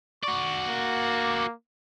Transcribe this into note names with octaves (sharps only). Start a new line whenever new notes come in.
F#4 D5 C#6
A#3